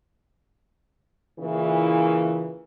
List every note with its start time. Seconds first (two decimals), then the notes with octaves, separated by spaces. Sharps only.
1.39 A#2 C#3 E3